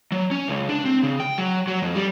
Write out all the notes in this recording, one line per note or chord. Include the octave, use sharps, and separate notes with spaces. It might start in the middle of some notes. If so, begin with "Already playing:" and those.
F#3
C#4
C#2
D4
C4
C#3
G5
F#3
F#3
F2
G3